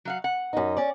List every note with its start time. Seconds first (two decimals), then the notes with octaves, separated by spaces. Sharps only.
0.05 F#3 F5 F#5
0.24 F#5
0.53 F#2 D#4
0.77 C#4 D5